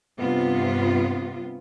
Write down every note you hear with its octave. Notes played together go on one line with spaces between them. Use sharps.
G2 C3 B3 F4